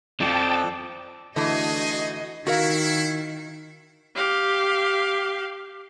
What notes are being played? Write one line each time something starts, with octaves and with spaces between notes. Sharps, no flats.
F2 F3 A4 D5 G5 A5
D3 E3 A3 D#4 F#4 G#4 D#5
D#3 E4 F#4 A#4 F5
G4 F5